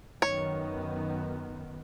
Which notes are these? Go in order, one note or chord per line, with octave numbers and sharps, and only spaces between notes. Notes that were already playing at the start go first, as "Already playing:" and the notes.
F#2 D#3 B3 C#5